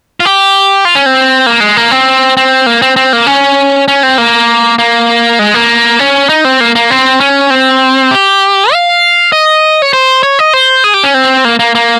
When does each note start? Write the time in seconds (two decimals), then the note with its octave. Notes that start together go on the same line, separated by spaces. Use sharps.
0.20 F4
0.25 G4
0.85 F4
0.95 C#4
1.06 C4
1.46 A#3
1.60 G#3
1.77 A#3
1.91 C4
2.37 C4
2.66 A#3
2.82 C4
2.96 C4
3.13 A#3
3.27 C#4
3.88 C#4
4.03 C4
4.18 A#3
4.79 A#3
5.39 G#3
5.54 A#3
5.99 C#4
6.29 D#4
6.45 C4
6.60 A#3
6.75 A#3
6.91 C4
7.20 C#4
7.50 C4
8.11 G4
8.72 F5
9.32 D#5
9.82 C#5
9.93 C5
10.23 C#5
10.39 D#5
10.53 C5
10.84 G#4
10.94 G4
11.03 C#4
11.14 C4
11.45 A#3
11.59 A#3
11.75 A#3